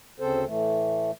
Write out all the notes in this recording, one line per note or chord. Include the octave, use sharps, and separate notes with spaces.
D2 C#3 C4 A4 C5
A2 E3 A3